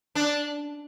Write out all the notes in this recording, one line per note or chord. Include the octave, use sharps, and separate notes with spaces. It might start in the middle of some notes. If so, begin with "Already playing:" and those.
D4